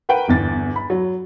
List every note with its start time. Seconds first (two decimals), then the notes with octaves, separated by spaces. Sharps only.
0.09 A#4 B4 F#5 G5
0.28 G1 E2 A6
0.76 B5
0.90 F#3